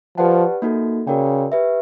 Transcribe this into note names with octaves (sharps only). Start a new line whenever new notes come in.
F3 G4 B4 D5 F#5 A5
A#3 D#4 F#4 A4
C#3 F#4 A#4 D5 G5
G4 B4 E5